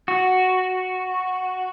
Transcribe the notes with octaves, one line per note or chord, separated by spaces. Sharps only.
F#4